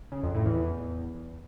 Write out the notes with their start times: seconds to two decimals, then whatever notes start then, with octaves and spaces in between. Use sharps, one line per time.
0.12 C#3
0.23 F2
0.34 A2
0.46 E2
0.57 E2